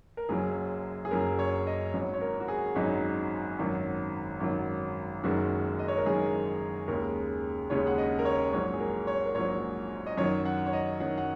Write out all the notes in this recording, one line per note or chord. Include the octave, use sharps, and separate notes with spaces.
A#4
F#1 F#2 F#3 G#4
G#4
F#1 F#2 F#3 A#4
C#5
D#5
G#1 F#2 F#3 C#5
C#5
A#4
F#4
G#4
G#1 F#2 F#3 D#4
G#1 F#2 D#3 F#3
G#1 F#2 D#3 F#3
F#1 F#2 D#3 G#3 F#4
D#5
C#5
A#4
F#1 F#2 D#3 G#3 G#4
D#2 C#3 G#3 A#4
D#2 C#3 G#3 C#5
F#5
D#5
A#4
C#5
A#1 G#2 F#3 C#5
G#4
A#4
C#5
A#4
A#1 G#2 F#3 C#5
D#5
F#2 D#3 F#3 C#5
F#5
C#5
D#5
F#2 D#3 F#3 F#5
F#5